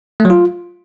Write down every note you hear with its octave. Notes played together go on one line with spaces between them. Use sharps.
A3
F#3
F4